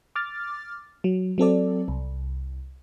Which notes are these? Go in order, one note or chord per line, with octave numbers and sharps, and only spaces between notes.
D6 F6 A6
F#3
F#3 C4 A4 D5
C2